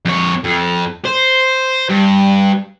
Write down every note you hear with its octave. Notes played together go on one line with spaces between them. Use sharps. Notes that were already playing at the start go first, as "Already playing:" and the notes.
F2 C#5
F2
C5
G2